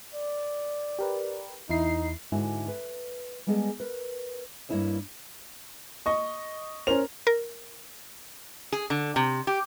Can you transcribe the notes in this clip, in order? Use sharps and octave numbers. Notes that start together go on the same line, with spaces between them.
D5
G4 A#4 B4
E2 D#4 E4 C7
G#2 D3 E4 F#4 G#5
B4
G3 G#3 B3 G#4 A4 D#5
A#4 B4
G2 F#3 A#3 E4 C#5 D#5
D#5 C#6
C#4 A#4 C5 F7
A#4
G#4
D3
C3
G4